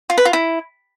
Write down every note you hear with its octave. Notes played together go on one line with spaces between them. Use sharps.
F4
B4
F4
E4